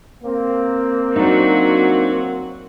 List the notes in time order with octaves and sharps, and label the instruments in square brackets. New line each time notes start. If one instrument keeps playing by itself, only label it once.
[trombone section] A#3 C4
[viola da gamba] F#3 F#4 [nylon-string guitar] D4 D#4